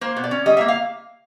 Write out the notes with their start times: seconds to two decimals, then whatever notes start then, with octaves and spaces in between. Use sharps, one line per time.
0.01 A#3 C5
0.17 B2
0.24 D5
0.31 C#4
0.46 G3 D#5
0.57 A#3 E5
0.68 F5